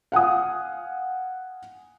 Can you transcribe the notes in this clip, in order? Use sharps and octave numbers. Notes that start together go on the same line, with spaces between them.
F5 F#5 G#5 D#6